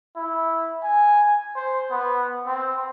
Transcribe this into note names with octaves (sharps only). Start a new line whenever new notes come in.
E4
G#5
C5
B3
C4